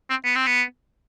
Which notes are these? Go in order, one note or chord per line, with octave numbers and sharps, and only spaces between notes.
C4
B3
C4
B3